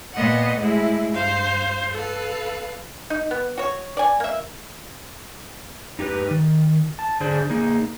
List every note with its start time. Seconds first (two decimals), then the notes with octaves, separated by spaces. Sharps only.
0.13 A#2 B3 D#5 F#5
0.56 A2 G#3 E4
1.11 G2 C5 F5
1.93 A4 B4 F5
3.10 D#4
3.31 B3
3.58 F#4 C#5
3.97 D5 G#5
4.20 A#3 E5
5.99 D#4 G4 G#4 B4
6.31 D#3
6.99 A5
7.21 D3 D4 G#4 C5
7.50 A#3 D#4 G#4